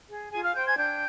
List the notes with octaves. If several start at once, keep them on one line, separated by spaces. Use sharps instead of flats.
G#4
F4 G#4 G#5
F5 F6
C5 G5 G6
G#5 G#6
D4 G5 G6